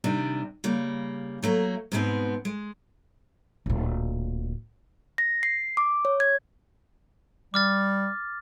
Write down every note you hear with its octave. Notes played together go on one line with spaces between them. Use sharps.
C3 D#3 G3 D4
C#3 G3 A#3
F#3 A3 A#3
G#2 B2 G#3 A3 B3 C4
G#3
D1 A#2
A#6
C7
D6
C#5
G#6
G3 D6 F6 A6